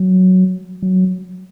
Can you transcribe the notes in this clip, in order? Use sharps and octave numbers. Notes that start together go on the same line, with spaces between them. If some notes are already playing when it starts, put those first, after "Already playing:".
Already playing: F#3
F#3